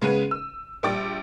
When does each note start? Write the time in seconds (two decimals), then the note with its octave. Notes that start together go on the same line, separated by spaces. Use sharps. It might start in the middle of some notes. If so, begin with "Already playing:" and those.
0.02 C#3 G#3 B3 G#4 B4 D#7
0.31 E6
0.83 A#1 G3 G5 D6 A6